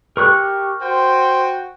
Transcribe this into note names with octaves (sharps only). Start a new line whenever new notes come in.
G4 A#4 C#6 F#6
F#4 C5 G5